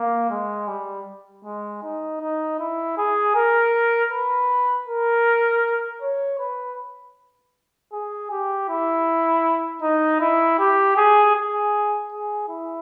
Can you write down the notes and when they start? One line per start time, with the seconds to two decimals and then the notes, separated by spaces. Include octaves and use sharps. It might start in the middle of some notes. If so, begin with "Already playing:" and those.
Already playing: A#3
0.30 G#3
0.68 G3
1.45 G#3
1.83 D#4
2.21 D#4
2.59 E4
2.97 G#4
3.35 A#4
4.11 B4
4.88 A#4
6.02 C#5
6.39 B4
7.93 G#4
8.31 G4
8.69 E4
9.82 D#4
10.20 E4
10.59 G4
10.97 G#4
11.35 G#4
12.12 G#4
12.49 E4